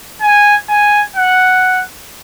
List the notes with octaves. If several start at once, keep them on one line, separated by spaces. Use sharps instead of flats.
G#5
G#5
F#5